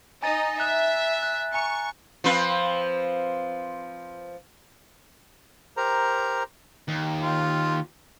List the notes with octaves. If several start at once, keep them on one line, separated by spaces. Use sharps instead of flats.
D#4 D#5 G#5 A#5 A6
E5 F#6
F#6
G#5 A#5 C#6
F3 C4 B4
G4 A#4 C5 A#5
D#2
F4